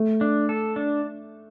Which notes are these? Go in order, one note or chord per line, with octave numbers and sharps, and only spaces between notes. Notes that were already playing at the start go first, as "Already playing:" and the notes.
Already playing: A3
D4
A4
D4